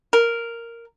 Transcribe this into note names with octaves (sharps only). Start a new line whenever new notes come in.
A#4